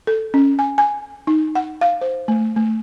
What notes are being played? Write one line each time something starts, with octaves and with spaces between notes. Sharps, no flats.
A4
C#4
G#5
G#5
D#4
F#5
F5
C5
A3
A3